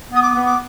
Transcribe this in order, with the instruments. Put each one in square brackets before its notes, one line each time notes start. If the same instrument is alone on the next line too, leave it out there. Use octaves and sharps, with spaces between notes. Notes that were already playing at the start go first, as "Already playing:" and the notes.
[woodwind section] B3 [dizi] D#6
[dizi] D6
[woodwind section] B3
[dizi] D6